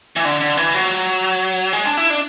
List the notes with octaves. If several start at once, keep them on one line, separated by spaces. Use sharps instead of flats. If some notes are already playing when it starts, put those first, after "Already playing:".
E3
D3
D3
E3
F#3
G#3
D4
E4
D4